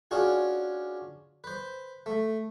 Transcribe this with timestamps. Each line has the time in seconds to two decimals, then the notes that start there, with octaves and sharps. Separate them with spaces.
0.11 C#4 D4 F4 F#4 G#4
1.44 B4 C5
2.06 A3